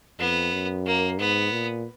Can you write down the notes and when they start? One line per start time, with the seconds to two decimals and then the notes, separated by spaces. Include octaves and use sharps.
0.19 F2 B3
0.53 F#2
0.86 A#3
1.19 G#2 B3
1.52 A#2